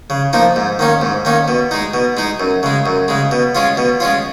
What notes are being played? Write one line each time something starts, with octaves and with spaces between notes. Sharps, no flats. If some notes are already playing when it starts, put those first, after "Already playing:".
C#3
F3 A#3 D#4
G#2
D#3 A#3 C#4
G#2
D#3 A#3 C#4
B2
G#3 D#4
B2
G#3 D#4
F#2
C#3 G#3
F#2
C#3 G#3
B2
G#3 C#4 F4
B2
G#3 C#4 F4